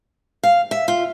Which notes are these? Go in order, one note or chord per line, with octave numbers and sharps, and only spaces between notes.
F5
E5
F4